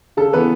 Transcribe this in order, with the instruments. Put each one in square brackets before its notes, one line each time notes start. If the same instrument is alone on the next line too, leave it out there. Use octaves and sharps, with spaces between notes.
[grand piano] C#3 A4
E3 B3 B4